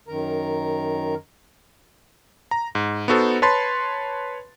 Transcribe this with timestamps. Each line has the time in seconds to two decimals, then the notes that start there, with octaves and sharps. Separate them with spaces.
0.08 F#2 D#3 A#4 A#5
2.51 A#5
2.75 G#2
3.08 B3 D#4 F#4 A4 C5
3.42 B4 C#5 A5 B5 C6 A6